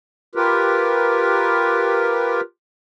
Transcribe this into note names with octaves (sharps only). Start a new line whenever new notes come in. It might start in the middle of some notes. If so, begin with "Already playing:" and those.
F4 G4 A#4 B4